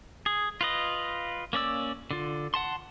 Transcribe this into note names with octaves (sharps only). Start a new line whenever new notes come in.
G#4
F4 B4 D#5
A#3 C#4 D5 E6
D3 F4
F#5 A5 C6